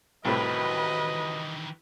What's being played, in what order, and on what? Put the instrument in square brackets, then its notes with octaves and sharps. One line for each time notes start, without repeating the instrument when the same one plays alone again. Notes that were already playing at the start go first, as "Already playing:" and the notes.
[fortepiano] C2 A2 [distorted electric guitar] D#3 E3 [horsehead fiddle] F#4 B4 [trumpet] D#5